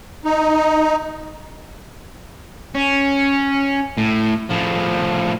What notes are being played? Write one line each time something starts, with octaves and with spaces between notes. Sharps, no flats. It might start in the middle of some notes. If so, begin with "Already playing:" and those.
D#4
C#4
A2
A2 F3